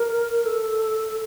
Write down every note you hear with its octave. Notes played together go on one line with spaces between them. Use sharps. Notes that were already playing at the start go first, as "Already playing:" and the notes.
Already playing: A#4
A4